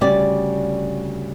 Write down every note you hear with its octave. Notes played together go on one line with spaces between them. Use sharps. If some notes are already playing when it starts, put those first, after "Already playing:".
D2 C#3 G3 D5